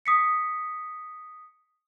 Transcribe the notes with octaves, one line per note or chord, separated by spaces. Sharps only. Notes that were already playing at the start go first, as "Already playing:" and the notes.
D#6 B6 C#7